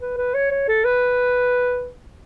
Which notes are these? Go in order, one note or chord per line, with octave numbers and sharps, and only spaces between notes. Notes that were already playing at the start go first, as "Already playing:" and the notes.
B4
B4
C#5
C#5
A4
B4